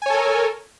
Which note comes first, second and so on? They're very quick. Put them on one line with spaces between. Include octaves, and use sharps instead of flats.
G#5 C#5 A4 A#4